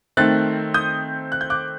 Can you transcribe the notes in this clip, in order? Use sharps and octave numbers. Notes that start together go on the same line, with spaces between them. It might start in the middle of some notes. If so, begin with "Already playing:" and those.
D#3 A3 C4 F#6 A6
D#6 G6
F#6
G6
D6 F#6